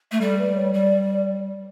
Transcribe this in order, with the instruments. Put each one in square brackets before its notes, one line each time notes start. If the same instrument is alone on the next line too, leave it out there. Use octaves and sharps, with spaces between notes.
[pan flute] A3
[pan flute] G3 [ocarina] A4
[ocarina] B4
C#5
[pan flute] G3 [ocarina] D5